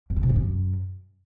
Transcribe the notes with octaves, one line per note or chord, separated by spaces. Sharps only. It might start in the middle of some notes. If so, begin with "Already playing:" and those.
F2
D3
C3
F2
F#2